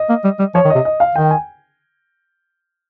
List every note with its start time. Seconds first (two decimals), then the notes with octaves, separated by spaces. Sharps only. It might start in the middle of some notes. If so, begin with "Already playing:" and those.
Already playing: D#5
0.09 A#3
0.24 G3
0.39 G3
0.55 F3 C#5
0.65 D#3
0.70 C3 D#5
0.85 D#5
1.00 F5
1.15 D#3 G5
1.31 G#5